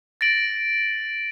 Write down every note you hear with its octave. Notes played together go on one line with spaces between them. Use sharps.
A6 A#6 D7 F#7